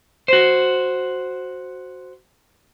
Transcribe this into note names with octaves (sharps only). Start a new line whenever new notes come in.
F#4 C5